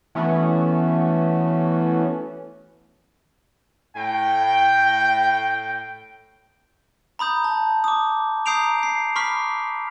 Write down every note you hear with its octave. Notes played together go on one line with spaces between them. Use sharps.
E3 A3 B3 C#4 F#4
A2 G5
A#5 B5 D#6 G6
A5
D6 D#6
A#5 D#6 G6 C7 D7 F7
C7
B5 C#6 D6 F6 B6